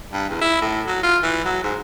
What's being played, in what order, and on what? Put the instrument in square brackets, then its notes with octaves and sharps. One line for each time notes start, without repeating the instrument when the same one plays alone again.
[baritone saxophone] G2
E2
E4
A2
F#3
F4
E3
F#3
G#2